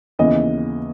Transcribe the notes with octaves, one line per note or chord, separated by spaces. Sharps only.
D#2 C#3 E3 B3 D#5